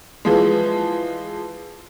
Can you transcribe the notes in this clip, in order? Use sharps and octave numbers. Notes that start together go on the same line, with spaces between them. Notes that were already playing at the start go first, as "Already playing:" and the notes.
E3 F3 G#3